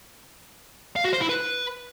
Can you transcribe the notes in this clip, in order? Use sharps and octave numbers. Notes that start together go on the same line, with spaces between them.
F5
F#4
C5
E4
B4